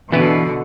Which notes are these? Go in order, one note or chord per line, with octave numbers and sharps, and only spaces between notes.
B2 D3 E3 B3 E4 B4